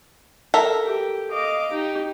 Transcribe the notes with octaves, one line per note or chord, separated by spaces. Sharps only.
A4 A#4 E5
G4
D#5 F5 D6
D#4 G4